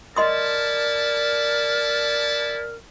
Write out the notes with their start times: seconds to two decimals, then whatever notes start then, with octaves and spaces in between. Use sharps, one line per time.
0.17 E4 A#4 D5 D#5 A5 C6 D#6